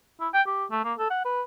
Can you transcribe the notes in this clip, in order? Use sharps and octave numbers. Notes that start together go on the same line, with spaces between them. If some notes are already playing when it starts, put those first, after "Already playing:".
E4
G5
G4
A3
A#3
A4
F#5
B4